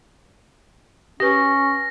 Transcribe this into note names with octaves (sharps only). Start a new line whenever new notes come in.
C#4 G4 B4 A#6